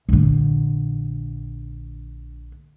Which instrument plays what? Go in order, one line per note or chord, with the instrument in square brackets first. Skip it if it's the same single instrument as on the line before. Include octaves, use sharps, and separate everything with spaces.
[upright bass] A#1 D3